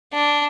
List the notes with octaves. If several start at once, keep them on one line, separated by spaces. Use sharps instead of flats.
D4